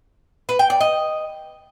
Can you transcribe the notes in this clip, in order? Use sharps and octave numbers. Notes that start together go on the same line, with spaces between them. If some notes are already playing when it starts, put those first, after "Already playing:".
B4
G5
D5
D#5